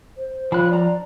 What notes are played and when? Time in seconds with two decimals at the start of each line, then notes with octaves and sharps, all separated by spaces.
0.18 C5
0.52 F3 C#4 F4 B5 F#6
0.69 D4 D5 A#5